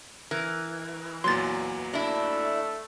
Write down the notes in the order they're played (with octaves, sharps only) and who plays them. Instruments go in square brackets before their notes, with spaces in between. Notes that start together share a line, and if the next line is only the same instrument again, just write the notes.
[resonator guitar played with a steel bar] E3 [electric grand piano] A#4
[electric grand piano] E2 A#2 F#3 [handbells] C6 A6
[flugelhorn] A3 [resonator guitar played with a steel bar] D4 E4